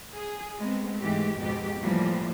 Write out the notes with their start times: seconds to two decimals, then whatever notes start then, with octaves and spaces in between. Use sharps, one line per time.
0.15 G#4
0.59 G#3 A3 B3 C4
1.01 G#2 E3 G#3 A3 G4
1.38 F2 G#2 B2 G#3 G4
1.81 A2 E3 F3 G3 A#3